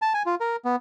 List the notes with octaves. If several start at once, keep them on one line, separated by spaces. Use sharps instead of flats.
A5
G#5
F4
A#4
B3